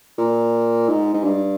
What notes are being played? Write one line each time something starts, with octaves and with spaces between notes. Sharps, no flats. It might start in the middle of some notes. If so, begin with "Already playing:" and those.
A#2
G#2
G#2
G2